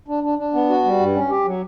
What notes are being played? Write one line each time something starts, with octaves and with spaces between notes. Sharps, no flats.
D4
D4
D4
B3
F#4
G3
G2
C#4
G4
F#3